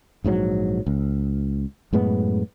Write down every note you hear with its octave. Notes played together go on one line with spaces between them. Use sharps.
A#1 G#2 B2 F#3
C#2
F#2 A2 G#3 B3